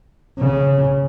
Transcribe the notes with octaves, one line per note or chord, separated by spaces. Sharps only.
C#3